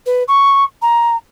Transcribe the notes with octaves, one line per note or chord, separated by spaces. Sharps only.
B4
C#6
A#5